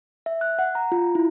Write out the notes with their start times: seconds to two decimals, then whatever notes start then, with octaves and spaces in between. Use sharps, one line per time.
0.26 E5
0.41 F#6
0.59 F#5
0.75 A#5
0.92 F4
1.15 E4